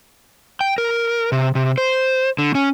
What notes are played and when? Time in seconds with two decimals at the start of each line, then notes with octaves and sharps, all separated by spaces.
0.61 G5
0.78 A#4
1.32 C3
1.55 C3
1.78 C5
2.39 D3
2.55 C#4